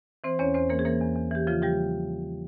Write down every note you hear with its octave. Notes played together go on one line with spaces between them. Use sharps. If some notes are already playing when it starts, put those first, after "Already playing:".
E3 C4 C5
E2 C#4 C#5
E2 C4 C5
E3 A#3 A#4
G#4
E3 A#3 A#4
E2
E2
E3 G4
C#3 F3 F4
F3 G3 G4